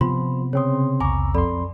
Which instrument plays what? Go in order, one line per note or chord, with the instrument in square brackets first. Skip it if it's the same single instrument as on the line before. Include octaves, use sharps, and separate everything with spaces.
[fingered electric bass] C3 B3 [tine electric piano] F3 [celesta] F4 B5 C6
[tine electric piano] C#3 C4 C6 [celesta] C#5 D#6
[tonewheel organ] B1 E2 [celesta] G#5 D6 [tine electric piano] A#5 C#6
[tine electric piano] F2 C6 [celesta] A4 D5 B5